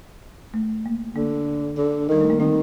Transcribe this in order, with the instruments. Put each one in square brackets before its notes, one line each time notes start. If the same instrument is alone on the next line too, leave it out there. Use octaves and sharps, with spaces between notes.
[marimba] A3
A#3
[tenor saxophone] D3 [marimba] A#3
[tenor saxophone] D3
[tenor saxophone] D#3 [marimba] G3
[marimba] A3
A#3
[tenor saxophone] D#3 [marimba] C4